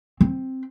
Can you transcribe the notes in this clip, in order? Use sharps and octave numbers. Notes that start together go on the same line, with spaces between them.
C4